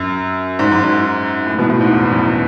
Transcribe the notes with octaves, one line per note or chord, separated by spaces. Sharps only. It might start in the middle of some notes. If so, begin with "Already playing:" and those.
Already playing: F#2
G#2
F#2
G#2
A2
B2
A2
G#2
E2
E2
F#2